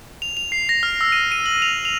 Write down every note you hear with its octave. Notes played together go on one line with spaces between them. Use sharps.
F7
F7
C7
A#6
F6
E6
D#7
D#7
F#7
F7
F7